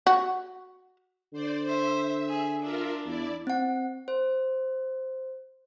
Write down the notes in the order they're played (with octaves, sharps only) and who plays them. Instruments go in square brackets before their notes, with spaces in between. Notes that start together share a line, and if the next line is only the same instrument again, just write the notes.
[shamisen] F#4
[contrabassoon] D3 [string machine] C5 D5
[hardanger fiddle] C5 [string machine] E5
[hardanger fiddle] G#4
[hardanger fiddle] D4 [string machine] F4 A#4 E5
[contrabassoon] E2 [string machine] E4 D5
[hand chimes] C4 F#5
C5